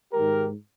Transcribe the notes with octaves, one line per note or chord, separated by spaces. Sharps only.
G#2 D#3 G#3 G4 A#4